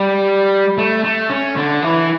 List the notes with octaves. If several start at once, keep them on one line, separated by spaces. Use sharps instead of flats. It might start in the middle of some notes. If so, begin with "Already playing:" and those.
Already playing: G3
A3
A3
C#4
D3
E3